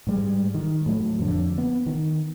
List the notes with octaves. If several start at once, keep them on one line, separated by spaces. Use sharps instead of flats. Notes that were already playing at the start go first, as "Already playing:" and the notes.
G#2 G3 G#3
D#3
A2 F#3
F2 D3
B3
D#3